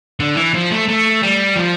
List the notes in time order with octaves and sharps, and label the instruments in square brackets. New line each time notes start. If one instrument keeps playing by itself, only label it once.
[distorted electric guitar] D3
E3
F3
A3
A3
G3
F3